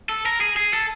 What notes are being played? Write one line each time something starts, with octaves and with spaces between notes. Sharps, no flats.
A4
A#4
G#4
G#4
A4